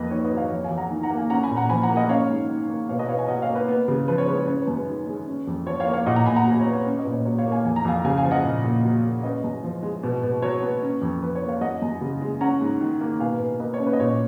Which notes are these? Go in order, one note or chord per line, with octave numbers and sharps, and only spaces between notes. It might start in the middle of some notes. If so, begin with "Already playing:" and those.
Already playing: F2 A#3 B4 D#5
D#3 C#5
B4 D#5
F#3
C#5 F5
F2 C#5
F5 G#5
F2
F#5 A#5
D#3
F#5 A#5
A#3
F5 G#5
C#4 F#5 A#5
G#5 B5
A#2
F#5 A#5
F3 G#5 B5
F#5 A#5
A#3
D#5 F#5
C#4 C#5 F5
G#2
D#3
A#3
B2 C#5 F5
B4 D#5
B2 C#5 F5
F5 G#5
F#3 D#5 F#5
C#5 F5
A#3
B4
B3
C#3
F3 B4
C#5
G#3 B4
C#5
C#4 C#5
B4
F#2
B4
D#3
G#3
C#4
F2
F3 C#5
C#5 F5
A#3
C#5 F5
A#2 D#5 F#5
F#5 A#5
A#2 G#5 B5
F#5 A#5
F#3
C#5
B3
C#5
C#4
B4 D#5
A#2
C#5
F#3 C#5
C#5 F5
A#3
F5 G#5
F2 G#5
A#5
F2 F5 G#5
C#3 F5 G#5
F5 G#5
F3
D#5 F#5
A#2
A#2
F#3
A#3
C#4 B4 D#5
F#2
F3
G#3
B2
B2
F#3 C#5
B3
C#4
F2
F3 B4
C#5
A#3
C#5 F5
F#2 D#5 F#5
F#2
C#3
G#3
C#4 F#5 A#5
G#2
D#3
A#3
B2 F5 G#5
B4
B2
A#3 B4 D#5
C#5
C#4
B4
D#5
A#2 C#5